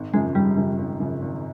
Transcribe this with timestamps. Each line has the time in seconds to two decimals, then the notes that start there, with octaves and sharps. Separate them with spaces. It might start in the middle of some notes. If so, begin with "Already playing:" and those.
Already playing: G#1
0.14 F#2 C#3 F3 G#3
0.35 G#1 G3
0.57 F#2 C#3 F3
0.78 G#1
1.00 F#2 C#3 F3
1.22 G#1